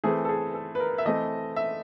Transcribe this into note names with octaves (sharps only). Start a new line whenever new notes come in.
E3 A3 C4 G#4
A4
G#4
A4
B4
A#4
E5
E3 A3 C4 D#5
E5